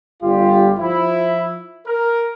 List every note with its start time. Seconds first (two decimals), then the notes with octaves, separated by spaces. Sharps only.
0.23 G1 G3 F4 G4
0.79 F3 E4
1.87 A#4